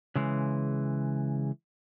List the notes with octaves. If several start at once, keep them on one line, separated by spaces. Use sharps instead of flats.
C#3 E3 G#3